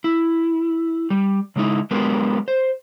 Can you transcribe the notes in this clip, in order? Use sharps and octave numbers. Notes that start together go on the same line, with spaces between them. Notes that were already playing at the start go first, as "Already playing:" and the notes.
E4
G3
C#3 G#3 A3 D#4 E4
F#3 G#3 B3 D4 G4 A#4
C5